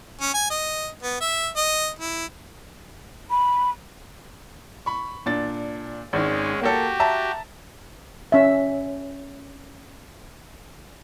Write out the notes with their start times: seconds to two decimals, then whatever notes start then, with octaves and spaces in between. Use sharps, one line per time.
0.21 C#4
0.34 G#5
0.50 D#5
1.03 B3
1.21 E5
1.56 D#5
1.99 E4
3.30 B5
4.86 B5 C#6
5.26 A#2 D4 A6
6.13 G#1 D#3 G#3 C#4
6.61 A#3 F#4 G4 A4
7.00 E5 A5 A#5
8.32 C#4 E5